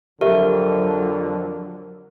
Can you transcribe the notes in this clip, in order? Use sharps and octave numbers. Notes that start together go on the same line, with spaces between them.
F2 D3 F#3 G4 A#4 E5